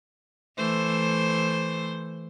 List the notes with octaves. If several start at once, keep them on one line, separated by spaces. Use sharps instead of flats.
E3 A3 C5